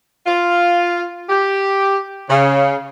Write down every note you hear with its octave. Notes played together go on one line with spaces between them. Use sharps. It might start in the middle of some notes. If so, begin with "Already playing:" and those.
F4
G4
C#3